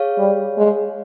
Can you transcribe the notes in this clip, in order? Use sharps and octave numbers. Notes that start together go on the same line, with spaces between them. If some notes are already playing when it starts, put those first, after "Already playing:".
Already playing: G#4 C#5 F5
G3
G#3